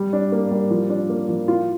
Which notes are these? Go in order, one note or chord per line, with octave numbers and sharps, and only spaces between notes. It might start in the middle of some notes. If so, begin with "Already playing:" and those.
Already playing: G3
D4
A#3
G3
F3
D4
A#3
F3
F4